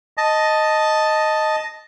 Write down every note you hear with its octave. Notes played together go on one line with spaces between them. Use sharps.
D#5 A5